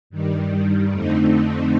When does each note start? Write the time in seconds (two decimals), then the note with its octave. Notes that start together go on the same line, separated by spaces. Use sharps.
0.10 G2 D#3 G3
0.91 F2 D3 A3 C4 D#4